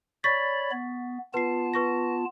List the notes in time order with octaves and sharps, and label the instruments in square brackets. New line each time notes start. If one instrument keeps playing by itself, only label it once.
[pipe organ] C#5 D5 B5 [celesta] C#6 A6 B6
[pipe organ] B3
[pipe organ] B3 F4 A5 [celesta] B4 C7
[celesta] B4 C#6 A#6